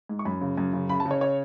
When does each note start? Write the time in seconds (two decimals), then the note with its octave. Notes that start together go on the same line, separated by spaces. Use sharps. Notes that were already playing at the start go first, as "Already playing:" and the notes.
0.09 G#2
0.19 C#6
0.25 F#2 B5
0.41 C#3
0.58 F#2
0.74 C#3
0.89 C#3 B5
1.00 A5
1.06 C#3
1.11 C#5
1.21 C#5